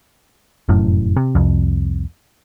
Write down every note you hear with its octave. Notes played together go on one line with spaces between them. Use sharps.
F1 F#2 A2
C3
C2 F2